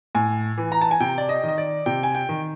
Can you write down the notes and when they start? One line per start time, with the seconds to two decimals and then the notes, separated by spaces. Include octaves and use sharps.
0.15 A2 G#5
0.58 E3
0.72 A#5
0.81 A5
0.91 G#5
1.00 C3 G5
1.18 D5
1.29 D#5
1.43 D#3 D#5
1.58 D5
1.86 C3 G5
2.03 G#5
2.15 G5
2.29 D#3